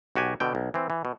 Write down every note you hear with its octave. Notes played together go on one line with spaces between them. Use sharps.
B1 F#4 G4 G#5
B2 D3 G5
B1
E3 C4
E3
B2